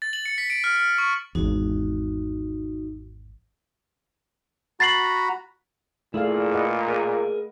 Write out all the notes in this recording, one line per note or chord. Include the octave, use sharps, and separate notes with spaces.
A6
F#7
C#7
B6
D7
F6
F6
C#6
G#1 E2 D#4 F#4
F#4 A#5 B5 A6 C7 F#7
A#2 A3 E4 G#4 D5 F5
B4 D#5 F#5
G#4 A#4